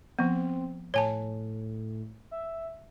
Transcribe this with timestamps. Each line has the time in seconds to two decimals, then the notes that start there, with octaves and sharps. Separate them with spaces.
0.19 F3 B3 C4
0.94 A2 C#5 G#5 A5
2.31 E5